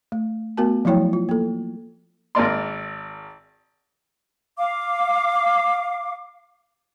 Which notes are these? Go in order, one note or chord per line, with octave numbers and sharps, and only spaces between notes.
A3
A3 B3 F#4 A#4 A5
F3 F#3 A3 E4 C#5 G5
F4
A#3 A4
G#1 A#4 D5 C6
F5 D6